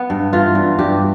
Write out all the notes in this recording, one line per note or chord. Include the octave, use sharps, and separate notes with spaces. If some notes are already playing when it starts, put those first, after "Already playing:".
Already playing: B3
G2
E3 F4
G2
G2 G4